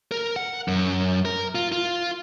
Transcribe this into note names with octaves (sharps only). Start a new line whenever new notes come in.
A#4
F#5
F#2
A#4
F4
F4